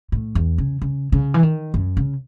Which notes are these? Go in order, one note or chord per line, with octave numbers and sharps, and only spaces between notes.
A2
E2
C#3
C#3
C#3
E3
D#3
F#2
C#3